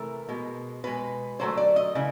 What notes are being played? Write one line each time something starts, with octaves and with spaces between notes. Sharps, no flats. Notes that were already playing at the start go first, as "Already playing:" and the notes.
Already playing: C3 E3 A3 A#4
B2 G#3
B2 G#3 B4
D3 F#3 A3 C5
D5
D#5
C#3 E3